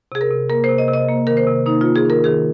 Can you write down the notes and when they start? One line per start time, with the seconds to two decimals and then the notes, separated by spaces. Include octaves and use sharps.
0.12 C3 G#4
0.21 A#4
0.31 C3
0.49 A#3 A#4
0.64 C5
0.69 C3
0.78 D#5
0.88 C3
0.93 D#5
1.09 A#3
1.27 D#3 A#4
1.37 C5
1.47 C3
1.66 A#3 D#4
1.81 A#3 F4
1.96 G#4
2.05 D#3 A#4
2.24 D#3 G#4